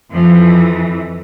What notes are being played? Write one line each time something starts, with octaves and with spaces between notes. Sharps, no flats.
F2 E3 F3